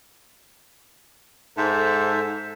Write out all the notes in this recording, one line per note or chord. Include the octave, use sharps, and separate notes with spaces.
G#2 A4 C5 E5 A5